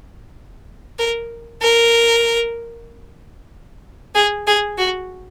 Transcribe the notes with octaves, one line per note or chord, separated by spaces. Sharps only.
A#4
A#4
G#4
G#4
F#4